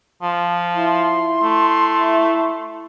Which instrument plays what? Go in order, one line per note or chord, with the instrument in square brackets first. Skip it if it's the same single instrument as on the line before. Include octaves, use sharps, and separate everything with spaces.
[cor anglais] F3
[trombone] E4 [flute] C6
[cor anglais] A3